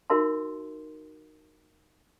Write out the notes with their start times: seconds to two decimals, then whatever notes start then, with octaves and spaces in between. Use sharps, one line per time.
0.10 D#4 F#4 A#4 E5 A5 C6